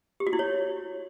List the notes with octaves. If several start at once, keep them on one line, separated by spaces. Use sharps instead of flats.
G4
F#4
E4
C#5